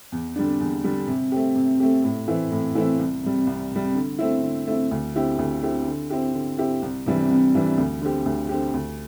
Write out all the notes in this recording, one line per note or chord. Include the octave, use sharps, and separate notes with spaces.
E2
D3 G3 D4
E2
D3 G3 D4
C3
A3 C4 G4
C3
A3 C4 G4
A2
E3 A3 C4 E4
A2
E3 A3 C4 E4
C2
C3 G3
C2
C3 G3
D3
A3 C4 E4
D3
A3 C4 E4
D2
D3 C4 E4 G4
D2
D3 C4 E4 G4
D3
C4 E4 G4
D3
C4 E4 G4
C2
C3 E3 G3 D4
C2
C3 E3 G3 D4
D2
D3 C4 G4
D2
D3 C4 G4
D2